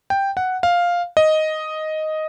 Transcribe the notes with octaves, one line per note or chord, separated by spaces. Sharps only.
G5
F#5
F5
D#5